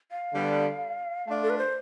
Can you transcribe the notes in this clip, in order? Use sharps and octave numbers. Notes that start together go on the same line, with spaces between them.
F5
D3 G3 B3
A3 D4 F4
A4
B4
C5